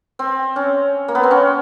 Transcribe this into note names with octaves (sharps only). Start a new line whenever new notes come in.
C4
C#4
A#3
B3
C4
C#4